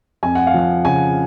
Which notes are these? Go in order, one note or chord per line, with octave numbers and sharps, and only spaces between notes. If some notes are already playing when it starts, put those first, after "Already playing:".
F2 G#5
F#5
F5
F3 F#5
C#3 G#5